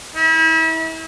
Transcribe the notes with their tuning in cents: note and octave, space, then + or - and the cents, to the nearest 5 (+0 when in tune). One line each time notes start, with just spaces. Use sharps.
E4 -35